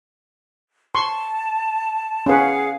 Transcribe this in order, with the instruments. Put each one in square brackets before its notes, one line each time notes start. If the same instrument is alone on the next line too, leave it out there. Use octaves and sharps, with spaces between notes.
[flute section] A5 [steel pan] C6 C#6
[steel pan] C#4 B4 [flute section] G#4 F5 F#5